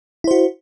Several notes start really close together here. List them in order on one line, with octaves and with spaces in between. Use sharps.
E4 C5 F#4